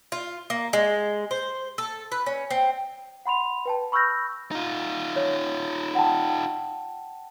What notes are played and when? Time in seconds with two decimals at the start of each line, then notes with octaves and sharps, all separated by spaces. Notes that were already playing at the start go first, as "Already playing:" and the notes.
0.12 F4
0.50 A#3
0.73 G#3
1.31 C5
1.78 A4
2.12 B4
2.26 C#4
2.51 C4
3.26 F#5 B5 C6 F7
3.66 B4 G5 A5
3.92 B5 C#6 E6 F6 G6 A#6
4.51 D#4 F4
5.16 C#5
5.95 F#5 G5 A5